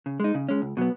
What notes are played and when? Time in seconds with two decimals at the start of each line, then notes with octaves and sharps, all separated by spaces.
0.06 C#3
0.20 G#3 D#4
0.35 C#3
0.49 G#3 C#4
0.62 C#2
0.77 B2 F#3 B3